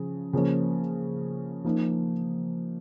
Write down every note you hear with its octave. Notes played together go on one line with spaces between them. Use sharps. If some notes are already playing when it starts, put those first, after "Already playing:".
Already playing: C#3 F3
C#3 F3 A#3 C#4
F3 A#3 D#4